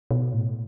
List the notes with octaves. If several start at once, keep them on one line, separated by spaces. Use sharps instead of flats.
B2
A2